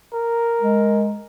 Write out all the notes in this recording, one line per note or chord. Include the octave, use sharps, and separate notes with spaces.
A#4
G#3